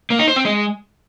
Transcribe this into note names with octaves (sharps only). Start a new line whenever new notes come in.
A#3
D#4
C5
C4
G#3